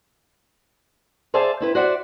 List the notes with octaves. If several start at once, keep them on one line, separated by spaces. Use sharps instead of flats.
G#4 C5 D5 E5 F5 A5
C4 E4 B4
F#4 C5 D5 E5 F#5